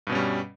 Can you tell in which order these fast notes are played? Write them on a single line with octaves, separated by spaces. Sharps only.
G2 B2 C#4 G3